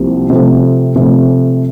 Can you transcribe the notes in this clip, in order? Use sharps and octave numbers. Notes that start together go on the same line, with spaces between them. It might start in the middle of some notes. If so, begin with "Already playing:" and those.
Already playing: C2 C3 F3 A#3
C3 F3 A3
C3 F3 A3